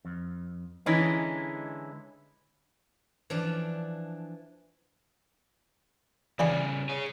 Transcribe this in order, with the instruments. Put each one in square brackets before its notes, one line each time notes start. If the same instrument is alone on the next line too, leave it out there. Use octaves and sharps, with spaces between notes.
[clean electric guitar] F2
[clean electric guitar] D3 G#3 E4 [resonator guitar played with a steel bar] E3 C#4 D#4
[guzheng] E3 F3 D4
[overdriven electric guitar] C#3 G3 [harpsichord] E3 D4 E4 [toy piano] D5 G#5 B5
[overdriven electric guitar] G#4 C#5